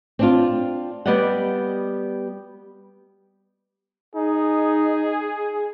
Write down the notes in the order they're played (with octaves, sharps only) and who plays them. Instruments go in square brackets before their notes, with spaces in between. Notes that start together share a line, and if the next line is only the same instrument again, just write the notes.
[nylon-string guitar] C4 D4 F4
G3 B3 G4 D5 D#5 F#5
[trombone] D#4 [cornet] G#4